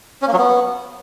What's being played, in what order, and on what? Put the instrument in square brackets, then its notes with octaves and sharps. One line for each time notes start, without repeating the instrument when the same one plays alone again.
[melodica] C#4
A#3
F#3
B3